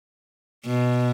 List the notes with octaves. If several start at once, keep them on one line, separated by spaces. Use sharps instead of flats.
B2